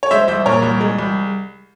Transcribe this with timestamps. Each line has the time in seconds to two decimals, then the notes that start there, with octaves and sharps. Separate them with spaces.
0.03 C#5
0.11 G#3 C5 E5
0.28 C2 C5 E5
0.45 A#2 A#4 C#5
0.62 C2
0.80 G#3
0.99 C2